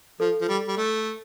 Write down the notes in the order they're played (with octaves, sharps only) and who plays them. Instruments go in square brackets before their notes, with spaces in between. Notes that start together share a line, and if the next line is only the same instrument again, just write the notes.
[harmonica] F3 [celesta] A4
[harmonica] F3
G3
G3
A3